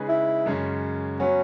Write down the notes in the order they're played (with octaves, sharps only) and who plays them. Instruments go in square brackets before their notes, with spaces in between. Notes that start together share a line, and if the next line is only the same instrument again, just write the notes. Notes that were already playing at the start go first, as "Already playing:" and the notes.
Already playing: [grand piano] C#3 G#3 D#4 G#4 B4
[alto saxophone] E4
[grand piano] F#2 C#3 G#3 C#4
[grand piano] F#3 B3 [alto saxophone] C#4